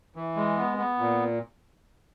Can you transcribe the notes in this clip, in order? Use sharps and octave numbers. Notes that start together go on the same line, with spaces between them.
E3
G#3
B3
B3
A#2